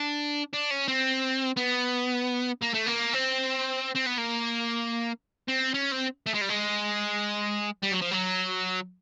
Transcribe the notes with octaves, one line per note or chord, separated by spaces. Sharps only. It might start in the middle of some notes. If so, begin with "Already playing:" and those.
Already playing: D4
D4
C#4
C4
B3
A#3
A3
A#3
C4
C4
B3
A#3
C4
C#4
C4
A3
G#3
G3
G#3
G3
F#3
F3
F#3